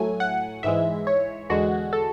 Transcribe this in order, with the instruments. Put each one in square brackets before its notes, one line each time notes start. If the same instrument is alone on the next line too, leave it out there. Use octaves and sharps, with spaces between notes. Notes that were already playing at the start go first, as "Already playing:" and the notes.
Already playing: [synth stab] A2 F#3 A3 G#5
F#5
G#2 E3 G#3 E5
C#5
E2 D3 G#3 F#4
A4